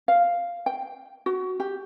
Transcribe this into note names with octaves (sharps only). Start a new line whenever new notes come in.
F5
G5
F#4
G4